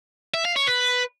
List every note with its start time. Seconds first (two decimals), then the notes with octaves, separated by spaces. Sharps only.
0.34 E5
0.45 F5
0.56 C#5
0.67 B4